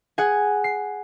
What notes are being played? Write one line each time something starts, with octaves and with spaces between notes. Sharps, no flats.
G#4 F#5 G#5
C7